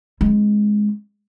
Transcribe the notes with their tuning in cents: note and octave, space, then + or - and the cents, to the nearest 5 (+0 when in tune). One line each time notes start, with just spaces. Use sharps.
G#3 +5 C4 +40